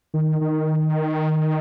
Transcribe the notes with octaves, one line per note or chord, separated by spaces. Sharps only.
D#3
D#3